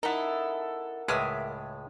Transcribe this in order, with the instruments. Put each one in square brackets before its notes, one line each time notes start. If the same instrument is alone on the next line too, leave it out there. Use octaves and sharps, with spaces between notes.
[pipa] D#4 [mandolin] E4 A4 [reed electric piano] A#4 F#5
[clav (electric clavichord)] C#2 A2 G#3 [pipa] B4 E5 [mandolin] D6 D#6 F6